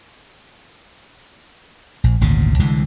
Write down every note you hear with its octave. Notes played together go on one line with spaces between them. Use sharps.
A#1
G#1 D2 A#2 C#3
C2 D3 E3 G#3